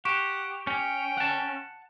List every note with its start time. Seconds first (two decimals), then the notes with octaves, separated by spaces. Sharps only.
0.05 G4 F#5 C#6 D7 E7
0.67 C#4 G5
1.17 F#5 A5